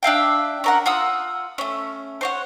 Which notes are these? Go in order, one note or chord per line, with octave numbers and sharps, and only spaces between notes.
D4 E5 F5 G5
C#4 A#4 F#5
F4 F#5 D#6 E6
A3 C#4
C5 C#5 F#5